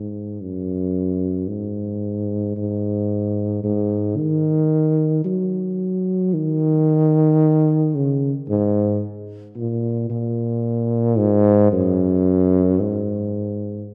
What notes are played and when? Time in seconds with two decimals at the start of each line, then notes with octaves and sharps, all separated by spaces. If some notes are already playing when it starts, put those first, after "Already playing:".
Already playing: G#2
0.41 F#2
1.48 G#2
2.57 G#2
3.63 G#2
4.17 D#3
5.25 F#3
6.34 D#3
7.95 C#3
8.49 G#2
9.56 A#2
10.10 A#2
11.18 G#2
11.72 F#2
12.79 G#2